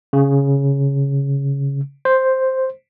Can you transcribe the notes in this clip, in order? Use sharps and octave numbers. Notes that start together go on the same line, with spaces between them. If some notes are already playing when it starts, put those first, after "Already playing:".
C#3
C5